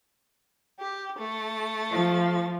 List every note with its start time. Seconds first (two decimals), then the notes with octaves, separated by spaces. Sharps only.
0.79 G4
1.19 A3 A6
1.90 F3